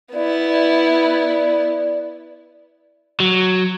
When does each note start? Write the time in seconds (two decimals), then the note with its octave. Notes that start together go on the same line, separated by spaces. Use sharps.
0.13 B3 E4 D5
3.20 F#3